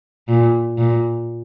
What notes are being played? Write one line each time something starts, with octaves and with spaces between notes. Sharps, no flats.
A#2
A#2